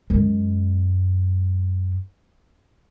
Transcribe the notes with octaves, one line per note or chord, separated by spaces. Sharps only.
F#2 G#3